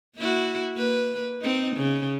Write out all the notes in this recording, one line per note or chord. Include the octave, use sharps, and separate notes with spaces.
A#3 E4 F#4
A#3 B4
C4 D#4
C#3